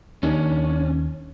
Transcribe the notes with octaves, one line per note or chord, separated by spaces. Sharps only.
D#2 D#3 C#4 D4